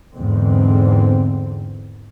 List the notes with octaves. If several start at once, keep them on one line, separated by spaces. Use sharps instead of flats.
E2 G#2 D3 C4